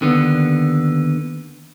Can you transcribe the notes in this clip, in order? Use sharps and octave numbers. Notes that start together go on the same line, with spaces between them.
D#2 D3 B3